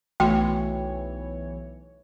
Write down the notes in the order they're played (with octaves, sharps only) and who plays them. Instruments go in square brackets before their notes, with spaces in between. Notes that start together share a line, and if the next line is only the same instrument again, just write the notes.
[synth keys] B1 E3 C#5 [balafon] A3 F#4 C6 [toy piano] G5